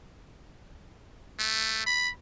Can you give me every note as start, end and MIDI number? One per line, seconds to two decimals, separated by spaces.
1.39 1.84 57
1.86 2.10 83